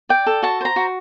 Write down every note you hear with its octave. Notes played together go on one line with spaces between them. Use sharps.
D5 G5
A4
F#4 A5
C5 A#5
F#4